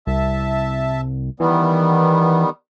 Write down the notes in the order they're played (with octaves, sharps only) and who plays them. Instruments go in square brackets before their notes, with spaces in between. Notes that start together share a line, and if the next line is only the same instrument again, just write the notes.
[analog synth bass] C2 [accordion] E5 A5
[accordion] D#3 G3 B3 [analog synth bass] E3